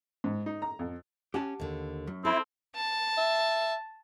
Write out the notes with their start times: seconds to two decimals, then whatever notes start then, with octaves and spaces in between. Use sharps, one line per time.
0.24 G#2
0.46 D#4
0.62 A#5
0.79 F2
1.34 C#4 G4 F#5 A5
1.60 D#2 D3
2.07 F#2
2.25 C4 E4 A4
2.76 A5
3.17 E5